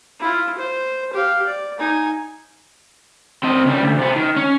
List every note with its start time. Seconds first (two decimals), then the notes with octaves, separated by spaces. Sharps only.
0.20 E4 F4
0.58 C5
1.13 G4 F5
1.46 D5
1.79 D#4 G#5
3.43 C4 D#5
3.65 C#3 G3
3.81 D2
3.98 C3 B3
4.16 D#3
4.37 C#4